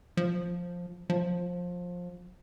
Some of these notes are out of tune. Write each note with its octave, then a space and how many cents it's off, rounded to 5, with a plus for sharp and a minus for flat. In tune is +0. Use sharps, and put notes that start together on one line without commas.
F3 +10
F3 +20